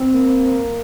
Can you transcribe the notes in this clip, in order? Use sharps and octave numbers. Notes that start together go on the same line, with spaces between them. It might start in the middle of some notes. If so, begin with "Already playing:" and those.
Already playing: C4
A#3